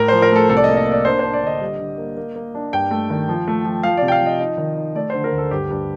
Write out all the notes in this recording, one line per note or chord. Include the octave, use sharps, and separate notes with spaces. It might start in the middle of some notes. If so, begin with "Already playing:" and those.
Already playing: A2 A#4
F3 C5
A#4
A3 A4
C2 A4
D5
D#5
A#3
D#5
A#3
D5
D4 C5
D4 C5
D5
D3 D#5
G3
D3
A#3
A#3
A#3
D4
G2 G5
A3
D#3
F3
A3
F3
F3 F5
C3 D5
G5
F5
F3
D#5
D#4
D#3
D#4
A3 D5
D3 C5
A#4
D2
A4
G2 G4
G2